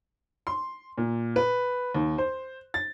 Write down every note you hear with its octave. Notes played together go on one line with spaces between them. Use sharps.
C6
A#2
B4
D#2
C5
A6